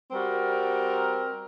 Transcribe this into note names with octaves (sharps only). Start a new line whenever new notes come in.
G3 C4 F#4 A#4